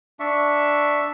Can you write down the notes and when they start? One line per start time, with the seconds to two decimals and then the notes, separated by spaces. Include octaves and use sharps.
0.20 D4 E5 C#6